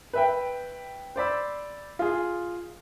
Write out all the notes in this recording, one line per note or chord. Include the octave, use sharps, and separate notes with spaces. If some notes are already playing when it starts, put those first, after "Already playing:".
B4 E5 G5
C5 D5 B5 E6
F4 G#4